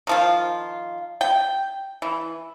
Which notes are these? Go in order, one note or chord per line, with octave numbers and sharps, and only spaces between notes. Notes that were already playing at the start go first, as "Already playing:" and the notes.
D#3 F3 F4
G5
E3